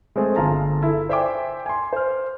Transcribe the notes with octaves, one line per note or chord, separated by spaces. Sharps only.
G#3 A3 C4 G#4
G1 F4 G#4 A5 A#5 C6
E4 A4
C5 D5 E5 G5 G#5 D6
G#5 C6
C5 F6